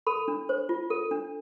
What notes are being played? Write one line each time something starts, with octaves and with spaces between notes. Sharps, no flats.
A4 B5
D4
C5
F4
A4
D4